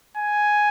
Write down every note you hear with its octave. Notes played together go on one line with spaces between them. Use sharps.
G#5